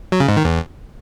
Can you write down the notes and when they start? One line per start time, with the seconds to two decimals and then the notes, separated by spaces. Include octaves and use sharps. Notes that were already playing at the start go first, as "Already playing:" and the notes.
0.12 F#3
0.20 C#3
0.28 G#2
0.37 D#3
0.45 E2